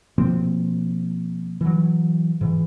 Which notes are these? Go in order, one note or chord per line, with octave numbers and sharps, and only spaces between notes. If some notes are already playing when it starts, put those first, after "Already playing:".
B2 F3 A#3 C4
E3 F#3
G#2 E3